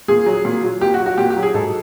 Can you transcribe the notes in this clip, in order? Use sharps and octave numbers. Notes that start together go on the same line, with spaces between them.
A#2 G#4
F#3
A#2
F#3
A#2 G4
F#4
F#3
F#4
A#2 G4
G4
F#3
G#4
G#2 A4